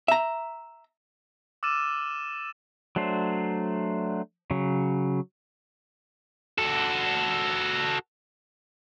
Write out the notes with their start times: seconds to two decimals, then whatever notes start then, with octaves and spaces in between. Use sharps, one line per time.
0.08 E5 A#5
1.63 D6 E6 F6 A6 D#7 E7
2.96 F#3 A3 D4 C5
4.51 C#3 F#3
6.58 F#4 A4